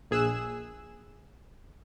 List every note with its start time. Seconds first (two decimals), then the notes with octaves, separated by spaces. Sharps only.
0.11 A#1 G#4 E6 F#6 E7